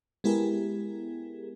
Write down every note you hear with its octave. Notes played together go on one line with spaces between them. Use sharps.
G#3 B3 E4 G4 G#4 A#4